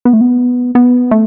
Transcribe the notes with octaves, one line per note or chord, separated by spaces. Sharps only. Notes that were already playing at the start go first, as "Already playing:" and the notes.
B3
A3
B3
B3
A3